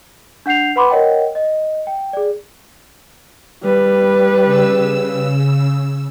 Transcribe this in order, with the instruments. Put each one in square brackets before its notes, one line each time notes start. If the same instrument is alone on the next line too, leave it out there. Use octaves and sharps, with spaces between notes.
[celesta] D4 F#5 G6 C7 F7
B4 F#5 B5 C6 D6
A#4 C#5 D#5 F#5 G5
D#5
G5
G#4 D5
[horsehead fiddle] G3 B4
[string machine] C#3 E6